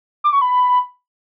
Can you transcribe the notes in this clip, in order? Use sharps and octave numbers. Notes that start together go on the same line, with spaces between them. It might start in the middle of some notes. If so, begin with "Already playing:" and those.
D6
C#6
B5